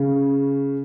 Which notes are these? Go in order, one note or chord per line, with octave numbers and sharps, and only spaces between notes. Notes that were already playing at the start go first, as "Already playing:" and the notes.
Already playing: C#3